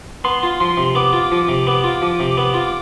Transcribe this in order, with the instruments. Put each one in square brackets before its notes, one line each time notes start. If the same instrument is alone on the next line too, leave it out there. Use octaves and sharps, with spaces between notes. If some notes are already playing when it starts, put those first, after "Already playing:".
[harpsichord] B3 [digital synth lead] C6
[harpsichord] F4
[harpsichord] F3 [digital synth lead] C6
[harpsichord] C3
[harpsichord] B3 [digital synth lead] D6
[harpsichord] F4
F3
C3
B3
F4
F3
C3
B3
F4